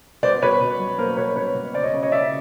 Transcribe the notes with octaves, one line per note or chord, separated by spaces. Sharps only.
B2 C5 D5
B2 B4 C#5
B2
F#3
A#3 A#4 C5
B2 B4 C#5
B2 B4 C#5
B2
C#3 C5 D5
C#5 D#5
C#3
C#5 D#5
C#3 D5 E5